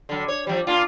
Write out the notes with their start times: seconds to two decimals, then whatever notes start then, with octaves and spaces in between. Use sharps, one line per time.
0.09 D3 F#3
0.28 C#5
0.47 F3 G3
0.67 A#3 D4 F4